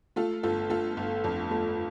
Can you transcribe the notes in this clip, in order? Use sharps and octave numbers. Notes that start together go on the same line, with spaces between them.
A3 F4 A4
G1 F4 A4
A3 F4 A4
G1
F2
A3